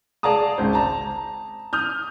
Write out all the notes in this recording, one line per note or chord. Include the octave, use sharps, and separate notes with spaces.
G#4 D5 F5 A5 A#5 D#6
G#1 C#2 C5
A5 A#5
D#6 F6 G6